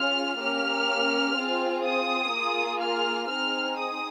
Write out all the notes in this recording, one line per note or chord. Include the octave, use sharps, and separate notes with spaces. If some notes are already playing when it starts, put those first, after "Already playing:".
Already playing: C#4 F4 G#4 F6
A#3 C#4 G4 F6
C4 F4 G#4
D#6
A#3 F4 G#4
F6
C4 D#4 G#4 F6
D#6